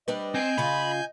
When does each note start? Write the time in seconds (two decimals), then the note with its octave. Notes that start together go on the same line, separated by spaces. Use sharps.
0.08 G3 D4 B4 D#5
0.34 C4 G#5 G6
0.58 C#3 F4 B5